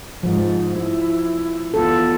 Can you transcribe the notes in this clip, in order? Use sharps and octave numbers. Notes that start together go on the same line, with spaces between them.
G#2 F3
E4
E2 F4 A4